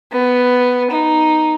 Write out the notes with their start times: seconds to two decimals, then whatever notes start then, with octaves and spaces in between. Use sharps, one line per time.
0.12 B3
0.91 D#4